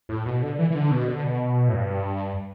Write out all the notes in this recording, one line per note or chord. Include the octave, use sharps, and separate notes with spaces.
A2
B2
D3
E3
E3
D3
B2
D3
B2
A2
G2